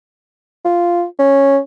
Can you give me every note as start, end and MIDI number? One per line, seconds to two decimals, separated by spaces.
0.65 1.04 65
1.19 1.59 61